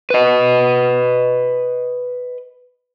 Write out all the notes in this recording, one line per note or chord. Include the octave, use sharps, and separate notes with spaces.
B4 D#5